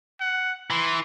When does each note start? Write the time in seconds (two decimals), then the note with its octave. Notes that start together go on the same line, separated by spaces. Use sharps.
0.20 F#5
0.71 E3 C6